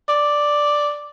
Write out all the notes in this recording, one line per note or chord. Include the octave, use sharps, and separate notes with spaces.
D5